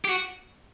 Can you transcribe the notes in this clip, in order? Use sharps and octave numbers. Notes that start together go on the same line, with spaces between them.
G4
F#4